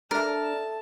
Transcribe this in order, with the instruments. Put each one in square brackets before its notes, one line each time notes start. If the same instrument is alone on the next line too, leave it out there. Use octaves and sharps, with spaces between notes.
[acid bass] D4 [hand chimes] A4 E5 [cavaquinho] A#4 [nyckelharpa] A5